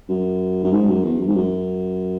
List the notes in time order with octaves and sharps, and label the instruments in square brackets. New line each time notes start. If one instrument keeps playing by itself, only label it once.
[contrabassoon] F#2
F#2
G#2
F#2
E2
F#2
G#2
F#2